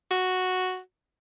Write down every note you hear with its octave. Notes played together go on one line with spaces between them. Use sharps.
F#4